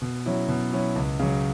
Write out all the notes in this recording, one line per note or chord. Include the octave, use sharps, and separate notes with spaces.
B2
F#3 C#4 E4
B2
F#3 C#4 E4
C#2
C#3 F#3